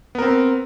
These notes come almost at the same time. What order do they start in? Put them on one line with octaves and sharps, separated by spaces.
B3 A#4 C4